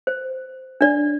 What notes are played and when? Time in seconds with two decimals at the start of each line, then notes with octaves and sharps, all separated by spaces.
0.07 C5
0.81 D4 D5